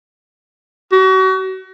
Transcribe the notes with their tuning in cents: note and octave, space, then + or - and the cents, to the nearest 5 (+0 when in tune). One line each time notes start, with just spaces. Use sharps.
F#4 +35